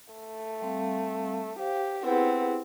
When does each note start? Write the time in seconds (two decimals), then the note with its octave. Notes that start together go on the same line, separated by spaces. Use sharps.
0.13 A3
0.62 G3 C4 F5
1.59 G4 C5 F5
2.04 B3 C4 E4 G4 G#4